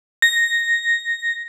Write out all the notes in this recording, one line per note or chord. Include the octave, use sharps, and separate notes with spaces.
A#6